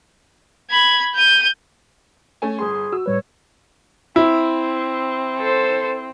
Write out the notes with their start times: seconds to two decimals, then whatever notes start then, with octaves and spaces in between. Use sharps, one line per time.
0.71 B5 G#6
1.15 G6 D#7
2.42 A3 C#4 G#5
2.59 G1 G#4 G#5 C6
2.93 F#4 E6
3.06 A2 G3 B4 C#5
4.16 C4 E4
5.38 A4 C5